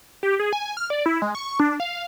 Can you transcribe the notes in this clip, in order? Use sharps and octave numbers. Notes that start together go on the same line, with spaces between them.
G4
G#4
G#5
F6
D5
E4
G#3
C#6
D4
F5